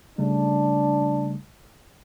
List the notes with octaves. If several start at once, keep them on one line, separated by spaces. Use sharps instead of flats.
C#3 G3 A3 D4